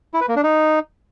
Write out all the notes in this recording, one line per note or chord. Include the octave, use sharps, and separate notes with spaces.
E4
B4
A#3
D4
D#4